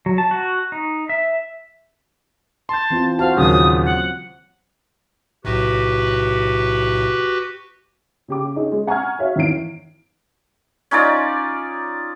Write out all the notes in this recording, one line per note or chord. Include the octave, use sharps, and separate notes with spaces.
F#3
A5
F#4
D#4
E5
A5 C6 G6
E3 C4 F4
F#4 C5 F5 A5
D#2 A#2 C#3 F#3 D#6
F#5
B1 A2 C3 F#4 G4 B4
C#3 G4 D6
C#4 D#4 G#4
G#3
F#5 G#5 A#5 C#6 F6 G#6
F#4 C#5 E5 F5
G#1 E2 D#3 E3 C7 D7
C#4 D#4 F4 D5